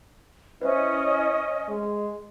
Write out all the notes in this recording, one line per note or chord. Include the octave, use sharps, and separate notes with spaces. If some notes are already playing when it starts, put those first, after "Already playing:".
C#4 E4 B4 C5 D#5 E5
G#3